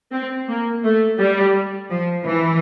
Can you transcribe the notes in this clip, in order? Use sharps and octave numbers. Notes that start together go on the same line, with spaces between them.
C4
A#3
A3
G3
F3
E3